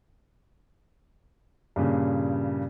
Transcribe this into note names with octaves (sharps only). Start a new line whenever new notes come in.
G2 A#2 C#3